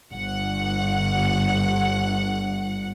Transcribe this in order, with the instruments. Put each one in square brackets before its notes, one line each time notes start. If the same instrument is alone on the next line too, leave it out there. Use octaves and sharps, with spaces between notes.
[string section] G1 F#5